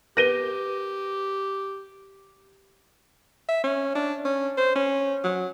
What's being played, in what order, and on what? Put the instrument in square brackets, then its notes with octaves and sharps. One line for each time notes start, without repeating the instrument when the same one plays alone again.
[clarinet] G4 [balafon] A#4 B4 [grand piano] A#6 D#7 G7
[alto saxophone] E5
C#4
D4
C#4
C5
C#4
F#3